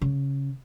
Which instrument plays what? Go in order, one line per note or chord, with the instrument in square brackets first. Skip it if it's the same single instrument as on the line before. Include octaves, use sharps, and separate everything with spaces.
[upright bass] C#3